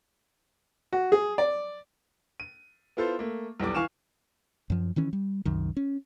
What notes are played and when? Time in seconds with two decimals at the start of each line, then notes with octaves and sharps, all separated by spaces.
0.93 F#4
1.12 G#4
1.38 D5
2.40 D#7
2.97 B3 E4 F4 A4 C5
3.19 A3 A#3
3.60 B1 E2 G3 D6
3.75 E3 F5 G#5 C#6 F6 E7
4.70 F#2 F3
4.96 D#3 E3 C#4
5.13 G3
5.45 C2 F#2 D#3
5.77 C#4